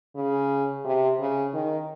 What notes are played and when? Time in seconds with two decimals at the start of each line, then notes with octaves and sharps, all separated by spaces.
0.16 C#3
0.85 C3
1.20 C#3
1.54 D#3